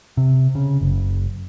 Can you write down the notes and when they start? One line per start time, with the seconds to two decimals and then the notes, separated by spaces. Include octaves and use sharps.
0.17 C3
0.55 C#3
0.81 F#1